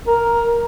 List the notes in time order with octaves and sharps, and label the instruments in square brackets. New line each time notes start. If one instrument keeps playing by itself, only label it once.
[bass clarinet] A#4